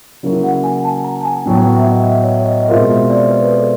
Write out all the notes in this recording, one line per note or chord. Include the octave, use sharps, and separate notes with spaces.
C#3 F#3 A#3 C#4 E4
F#5
G#5
A5
A#5
A5
G#5
A2 F#3 B3 G5
E5
D#5
E5
C#5
D#5
D#5
B2 G#3 C4 F4 A#4 E5
E5
D5
B4
A4